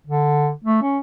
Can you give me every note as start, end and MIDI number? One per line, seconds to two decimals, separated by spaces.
0.07 0.51 50
0.65 0.82 57
0.82 0.99 61